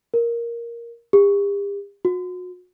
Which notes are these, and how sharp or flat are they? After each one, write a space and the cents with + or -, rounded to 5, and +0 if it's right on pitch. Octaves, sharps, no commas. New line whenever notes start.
A#4 +5
G4 +40
F#4 -35